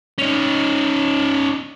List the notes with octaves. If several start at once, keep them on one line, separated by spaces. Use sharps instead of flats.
C#4 D#4